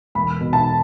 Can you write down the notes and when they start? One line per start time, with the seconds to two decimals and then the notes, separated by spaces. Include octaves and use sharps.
0.15 E1 B5
0.41 B2
0.53 A5